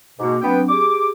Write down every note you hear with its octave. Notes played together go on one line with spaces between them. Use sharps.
G#2 B2 A#3 F#4 D6
F#3 B3 C4 D4 G5
G4 G#4 D6